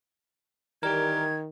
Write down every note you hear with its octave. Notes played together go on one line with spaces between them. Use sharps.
D#3 E3 G3 G4 A#4 G#6